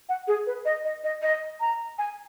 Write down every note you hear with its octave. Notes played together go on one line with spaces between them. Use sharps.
F#5
G#4
B4
D#5
D#5
D#5
D#5
A#5
G#5